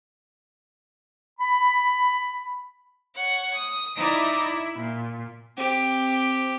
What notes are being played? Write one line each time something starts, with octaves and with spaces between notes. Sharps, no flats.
B5
C#5 F#5
D#6
D#4 E4 D5 E5 A#5 D6
E4
A#2
C4 G4